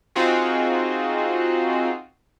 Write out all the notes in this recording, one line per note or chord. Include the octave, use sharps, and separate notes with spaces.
C4 D#4 F4 F#4 G#4